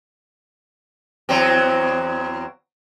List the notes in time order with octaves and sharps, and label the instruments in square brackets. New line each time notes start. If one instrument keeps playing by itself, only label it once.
[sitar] E2 F#3 C4